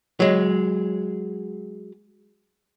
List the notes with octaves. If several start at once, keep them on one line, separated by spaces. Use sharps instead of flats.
F#3 G#3